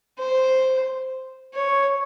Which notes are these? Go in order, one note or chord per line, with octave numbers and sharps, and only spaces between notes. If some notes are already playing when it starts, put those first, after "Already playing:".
C5
C#5